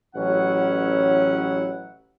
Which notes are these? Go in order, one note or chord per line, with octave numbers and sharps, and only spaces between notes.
A1 F#3 C#4 E4 F#5